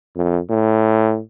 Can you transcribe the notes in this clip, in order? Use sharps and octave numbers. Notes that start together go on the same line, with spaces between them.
F2
A2